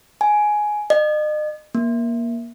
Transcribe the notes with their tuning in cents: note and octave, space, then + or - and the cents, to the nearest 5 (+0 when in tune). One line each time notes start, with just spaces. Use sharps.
G#5 +10
D#5 -40
A#3 +20